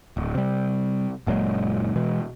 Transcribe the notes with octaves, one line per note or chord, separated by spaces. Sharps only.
D1
C3 G3
F#1 A#2 F#3 G#3
B2 E3 G#3